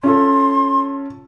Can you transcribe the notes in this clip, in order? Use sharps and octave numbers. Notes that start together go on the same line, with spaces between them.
C#4 F4 A4 C6